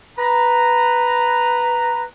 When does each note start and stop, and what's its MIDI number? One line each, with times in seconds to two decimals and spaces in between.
0.18 2.03 71
0.18 2.03 82